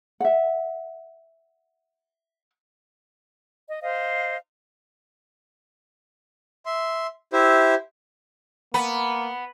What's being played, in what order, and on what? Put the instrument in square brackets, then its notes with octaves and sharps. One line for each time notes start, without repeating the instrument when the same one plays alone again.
[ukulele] E5 F#5
[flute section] D#5
C5 D#5 F5
[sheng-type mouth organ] E5 C6
E4 G4 C5 E5
[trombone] A#3 [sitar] B3 [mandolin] B5